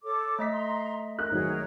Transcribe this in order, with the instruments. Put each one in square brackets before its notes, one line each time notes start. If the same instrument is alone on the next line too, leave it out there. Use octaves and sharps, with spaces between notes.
[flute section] A4 C#5 D6
[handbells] A3 D#5 B6
[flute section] A#5 C6
[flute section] A#4 [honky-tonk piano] F#6
[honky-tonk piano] G#1 F#3 [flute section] G#4 A#4 C#5